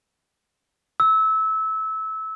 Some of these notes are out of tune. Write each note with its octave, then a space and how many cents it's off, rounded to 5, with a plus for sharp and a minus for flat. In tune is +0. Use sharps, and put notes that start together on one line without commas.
E6 -20